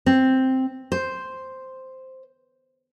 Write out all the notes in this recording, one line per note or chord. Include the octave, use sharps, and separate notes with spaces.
C4
C5